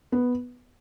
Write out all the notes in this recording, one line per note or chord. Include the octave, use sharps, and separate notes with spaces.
B3